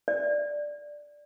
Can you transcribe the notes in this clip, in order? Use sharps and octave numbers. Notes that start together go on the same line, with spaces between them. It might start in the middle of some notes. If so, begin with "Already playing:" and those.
D5